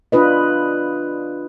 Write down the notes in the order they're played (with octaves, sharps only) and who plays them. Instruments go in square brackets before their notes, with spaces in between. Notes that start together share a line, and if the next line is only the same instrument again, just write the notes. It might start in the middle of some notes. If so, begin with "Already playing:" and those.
[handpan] D4 F4 B4 D#5